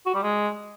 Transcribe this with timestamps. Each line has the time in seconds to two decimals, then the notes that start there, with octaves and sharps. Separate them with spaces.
0.06 F#4
0.14 G3
0.23 G#3